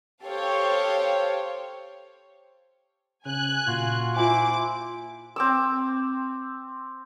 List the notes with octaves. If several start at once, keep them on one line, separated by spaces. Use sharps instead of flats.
G4 A4 C5 C#5 F5
C#3 G#5 F#6
A#2 F4 F#4
E4 F4 C5 G#5 D6
C4 D6 E6